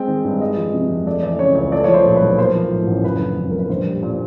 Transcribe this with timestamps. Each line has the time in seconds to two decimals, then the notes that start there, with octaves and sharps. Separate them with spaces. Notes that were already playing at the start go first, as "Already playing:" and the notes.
Already playing: G#3 C4 G5
0.08 D#3
0.24 G2
0.40 G#3 D#5
0.57 F3
0.74 C3
0.90 F2
1.06 A3 D5
1.23 E3 D5
1.39 C#3 C#5
1.55 C#2 C#5
1.72 A3 D5
1.84 F3 C#5
1.94 C5
2.06 A#2
2.16 B4
2.22 B1
2.38 A#3 C5
2.55 F3
2.71 A2
2.87 A1
3.04 F#1 B4
3.20 D3
3.37 F2
3.51 F#1 A#4
3.59 B4
3.69 A#1 C5
3.85 G3
4.03 A#2